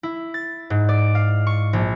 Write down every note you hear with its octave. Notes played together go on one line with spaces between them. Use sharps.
E4
A6
G#2
D5
F5
C#6
A#1